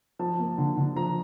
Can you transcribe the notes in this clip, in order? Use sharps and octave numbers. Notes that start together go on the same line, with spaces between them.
F3 A5
A#3
D3
D3
F3 A#5